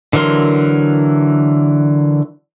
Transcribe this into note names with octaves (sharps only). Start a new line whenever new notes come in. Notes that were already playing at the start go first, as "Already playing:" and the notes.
D3 E3 F#3 A#4 C6